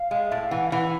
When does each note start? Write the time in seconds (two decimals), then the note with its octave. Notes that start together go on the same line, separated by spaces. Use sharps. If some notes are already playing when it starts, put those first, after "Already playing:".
Already playing: F5
0.11 G#3
0.29 A2 E5
0.40 F5
0.51 E3 F#5
0.67 F5
0.72 E3 F#5
0.82 F#5